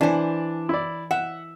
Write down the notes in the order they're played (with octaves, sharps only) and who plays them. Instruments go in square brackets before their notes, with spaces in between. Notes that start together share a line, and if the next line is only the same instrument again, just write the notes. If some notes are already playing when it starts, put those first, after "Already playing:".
[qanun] E3 C5 [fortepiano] D4 D5 G#5
[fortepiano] E4 D5
[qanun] E5 [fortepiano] F#5